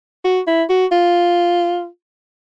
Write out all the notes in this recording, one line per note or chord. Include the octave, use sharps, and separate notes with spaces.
F#4
E4
F#4
F4